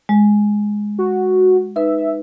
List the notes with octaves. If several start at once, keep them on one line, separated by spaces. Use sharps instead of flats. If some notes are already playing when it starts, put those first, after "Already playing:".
G#3
F#4
D#4 B4 E5